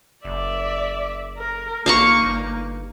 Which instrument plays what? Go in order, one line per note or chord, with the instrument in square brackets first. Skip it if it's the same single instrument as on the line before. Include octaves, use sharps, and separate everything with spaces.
[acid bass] F#1 [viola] D5 E5
[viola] A#4
[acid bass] A#1 [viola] A#3 D#4 [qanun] F5 A#5 C#6
[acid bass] G1